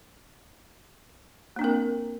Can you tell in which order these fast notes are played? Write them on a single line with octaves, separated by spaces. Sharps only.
A#3 D4 C4 A#4